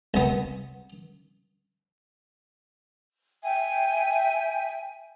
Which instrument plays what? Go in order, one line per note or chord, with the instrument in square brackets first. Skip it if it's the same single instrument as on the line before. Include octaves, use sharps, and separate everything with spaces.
[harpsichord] C2 B3
[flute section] E5 G5 G#5